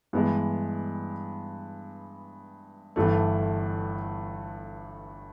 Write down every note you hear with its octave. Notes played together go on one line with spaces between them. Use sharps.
G2 E3 G#3 B3
G1 G2 E3 A3